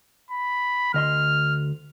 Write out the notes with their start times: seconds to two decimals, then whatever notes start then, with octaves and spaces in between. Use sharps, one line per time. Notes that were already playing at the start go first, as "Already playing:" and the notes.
0.31 B5
0.94 D2 D#5 C6 F6